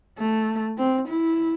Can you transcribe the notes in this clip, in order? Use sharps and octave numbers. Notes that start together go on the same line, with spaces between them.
A3
C4
E4